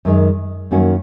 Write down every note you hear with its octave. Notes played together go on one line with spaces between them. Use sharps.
F#2 D#3 G#3
F#2 D#3 A#3 C#4 F#4